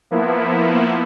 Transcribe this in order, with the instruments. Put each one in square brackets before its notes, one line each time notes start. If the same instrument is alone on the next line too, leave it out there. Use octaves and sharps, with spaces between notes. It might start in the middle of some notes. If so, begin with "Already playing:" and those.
[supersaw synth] F3 A#3 B3 E4